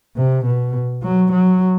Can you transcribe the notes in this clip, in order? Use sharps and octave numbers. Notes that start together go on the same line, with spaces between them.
C3
B2
F#3
F#3